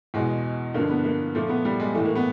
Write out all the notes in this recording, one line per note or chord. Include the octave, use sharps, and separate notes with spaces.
E2 B2 G#3
G2 D3 F3 A#3
B3
A#3
A#2 F3 A3
B3
G3
G#3
A2 E3 A3
A#3
B3